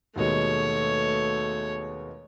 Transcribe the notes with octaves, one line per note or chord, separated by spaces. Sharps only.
D#2 B2 G#3 A3 C#5